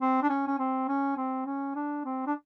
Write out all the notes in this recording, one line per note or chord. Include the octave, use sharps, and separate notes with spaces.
C4
D4
C#4
C#4
C4
C#4
C4
C#4
D4
C4
D4